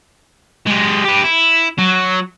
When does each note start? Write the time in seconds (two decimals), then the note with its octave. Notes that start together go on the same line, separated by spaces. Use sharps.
0.66 G#3 G4
1.04 G4 B4
1.24 E4
1.79 F#3